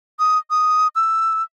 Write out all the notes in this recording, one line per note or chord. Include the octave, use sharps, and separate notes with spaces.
D#6
D#6
E6